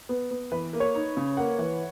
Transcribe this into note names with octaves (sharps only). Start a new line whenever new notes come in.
B3
B3
E3 B4
A#3
C#5
D#4
C#3
A#3 F#5
E3